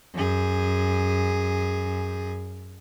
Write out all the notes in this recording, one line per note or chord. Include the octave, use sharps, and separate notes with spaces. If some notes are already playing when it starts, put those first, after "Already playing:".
F#2 G#4